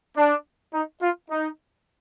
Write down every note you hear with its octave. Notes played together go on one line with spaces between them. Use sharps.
D4
D#4
F4
D#4